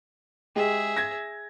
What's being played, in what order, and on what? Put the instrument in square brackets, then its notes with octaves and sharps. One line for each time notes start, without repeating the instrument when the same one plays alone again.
[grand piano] G#3 G4 [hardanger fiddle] G#4 E5
[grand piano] G#6 A#6